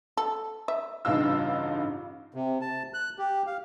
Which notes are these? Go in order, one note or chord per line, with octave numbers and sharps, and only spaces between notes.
A4
E5
A1 G2 C#3 D#4 F4 E6
C3
A5
F#6
G4
F5